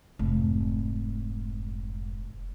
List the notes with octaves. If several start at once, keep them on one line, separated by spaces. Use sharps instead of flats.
F1 G#2